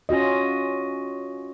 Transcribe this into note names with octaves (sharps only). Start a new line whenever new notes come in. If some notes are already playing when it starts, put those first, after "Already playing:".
C#4 F4 F#4 D#5